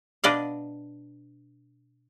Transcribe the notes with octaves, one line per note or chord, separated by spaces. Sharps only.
B2 D4 B4 D5 D#5 F5